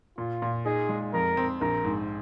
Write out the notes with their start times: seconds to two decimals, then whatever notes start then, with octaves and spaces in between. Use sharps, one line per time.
0.18 A#2 F4
0.42 A#2
0.66 D#4 G#4
0.89 G#3
1.13 F2 A#4
1.37 C4
1.61 A#1 A#4
1.84 G#2